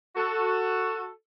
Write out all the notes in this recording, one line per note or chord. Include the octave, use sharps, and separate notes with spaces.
F#4 A4